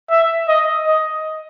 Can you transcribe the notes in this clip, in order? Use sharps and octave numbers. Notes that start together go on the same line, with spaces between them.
E5
D#5
D#5